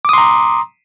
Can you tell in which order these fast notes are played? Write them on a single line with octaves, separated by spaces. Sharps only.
D6 D#6 C6 A#5